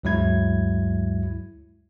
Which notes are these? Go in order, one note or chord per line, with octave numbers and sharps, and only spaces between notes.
D2 G2 F#3 G#3 E4 G#6